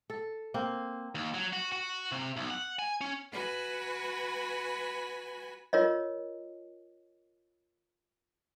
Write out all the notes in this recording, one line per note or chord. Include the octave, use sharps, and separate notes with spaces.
A4
A#3 C4
D#2
F#3
F#4
F#4
C3
B1
F#5
G#5
C#4
F#4 B4 G#5 B5
F4 A#4 C#5 D#5